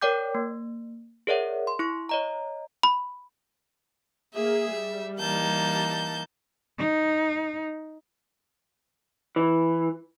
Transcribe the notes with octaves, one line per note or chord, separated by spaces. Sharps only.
A#4 C#5 D5 G5 D6 G6
A#3
G#4 A#4 C#5 D5 E5 F#5
C6
E4 C#6
C#5 D#5 A#5
B5
A#3 G#4 E5
G3
E3 A#3 D#4 A5 G6
D#4
E3